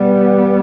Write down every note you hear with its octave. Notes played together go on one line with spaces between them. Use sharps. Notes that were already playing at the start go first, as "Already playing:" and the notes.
Already playing: E2 B2 G3 B3